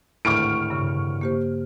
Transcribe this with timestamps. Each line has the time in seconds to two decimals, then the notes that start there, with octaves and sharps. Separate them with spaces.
0.25 G#1 D2 A2 C#6 F6 D7
0.70 G2 C#3
1.21 A#3 G4 C5